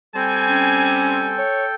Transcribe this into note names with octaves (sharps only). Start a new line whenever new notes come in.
G3 C4 A4 G5 G#5
C#4
C#5